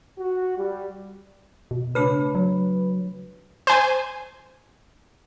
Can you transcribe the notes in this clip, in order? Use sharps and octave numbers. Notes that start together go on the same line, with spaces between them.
F#4
G3
B2
C#3 A3 D4 B4
F#3
C5 G#5